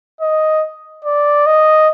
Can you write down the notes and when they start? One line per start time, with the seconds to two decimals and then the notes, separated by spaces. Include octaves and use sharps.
0.21 D#5
1.04 D5
1.46 D#5